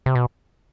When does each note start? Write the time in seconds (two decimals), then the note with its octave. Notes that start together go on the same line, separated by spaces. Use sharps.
0.06 C3
0.15 B2